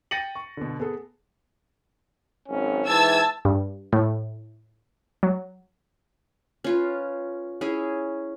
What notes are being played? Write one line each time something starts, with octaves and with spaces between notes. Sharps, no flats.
G5 A6 A#6 C#7 D#7 F#7
C#6
B2 D3
B3 G#4 A4
G#1 F#2 C#4
G#2 E3 A5 E6 G#6
G2
A2
F#3
C#4 F4 B4
C#4 E4 G#4